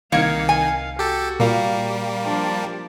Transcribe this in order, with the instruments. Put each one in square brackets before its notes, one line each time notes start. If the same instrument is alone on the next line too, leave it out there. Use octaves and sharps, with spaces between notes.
[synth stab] C2 G#6 C#7 [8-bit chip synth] D#3 [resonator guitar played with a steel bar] A#3 [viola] F5
[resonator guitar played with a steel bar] G#5
[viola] F#4 [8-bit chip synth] G4 A4
[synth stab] A#2 F5 [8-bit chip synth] G3 A#3
[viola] F3 D4